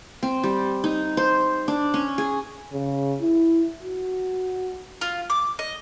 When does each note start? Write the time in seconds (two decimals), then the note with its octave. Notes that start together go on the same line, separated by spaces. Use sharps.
0.23 C4
0.44 G3
0.84 D#4
1.17 C5
1.68 D4
1.94 C#4
2.18 G#4
2.73 C#3
3.21 E4
3.83 F#4
5.01 F4
5.30 D6
5.59 D#5